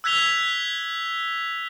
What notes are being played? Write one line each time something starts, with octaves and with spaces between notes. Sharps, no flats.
E6 F#6 G#6 B6 F7 G7